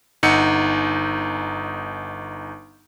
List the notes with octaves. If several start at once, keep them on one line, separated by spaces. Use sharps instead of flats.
G1 D#4 F#5 E6 C#7